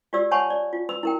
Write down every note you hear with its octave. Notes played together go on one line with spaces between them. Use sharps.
F4 G4 D5 E6
C#5 F#5 G#5 A5 B5 C#6
D5
F4
B4 B5 E6
E4 A#4 G5